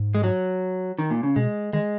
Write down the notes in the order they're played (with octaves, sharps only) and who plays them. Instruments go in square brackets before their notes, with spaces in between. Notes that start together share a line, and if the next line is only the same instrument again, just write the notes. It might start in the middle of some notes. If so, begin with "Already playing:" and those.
Already playing: [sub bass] G#2
[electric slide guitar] G#3
F#3
D#3
A#2
C#3
[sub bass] B2 [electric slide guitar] G#3
[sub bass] D#3 [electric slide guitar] G#3